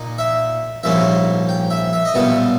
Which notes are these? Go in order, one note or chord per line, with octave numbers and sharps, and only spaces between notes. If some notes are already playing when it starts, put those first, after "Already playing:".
Already playing: A#2 A#3 D#4
E5
A#1 G#2 G3 A#3 C#4 E5
G5
E5
E5
D#5
B1 A#2 G3 B3 E5